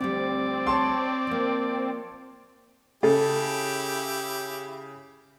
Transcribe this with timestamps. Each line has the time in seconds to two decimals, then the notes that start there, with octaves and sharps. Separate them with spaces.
0.01 D2 F3 G3 C4 D5
0.67 C#5 A5 C6
1.27 F3 A#3
3.03 C#3 E4 G4 A4